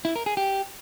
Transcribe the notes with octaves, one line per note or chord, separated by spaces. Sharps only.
E4
A#4
G#4
G4